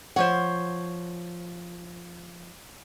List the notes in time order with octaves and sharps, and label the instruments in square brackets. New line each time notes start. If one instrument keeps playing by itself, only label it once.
[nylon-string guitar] F3 F#5 [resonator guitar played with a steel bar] C5 C#5